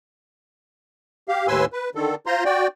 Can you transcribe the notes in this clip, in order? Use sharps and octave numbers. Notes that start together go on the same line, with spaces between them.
G4 F5
D#2 A2 B4 G#5 C6 E6
B4
D3 D#3 A4
F4 C5 A#5 C6
F#4 D5 G5